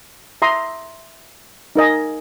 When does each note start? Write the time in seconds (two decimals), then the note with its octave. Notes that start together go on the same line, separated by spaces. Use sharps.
0.42 E5 A#5 C6 D#6
1.76 D#4 A#4 D#5 G#5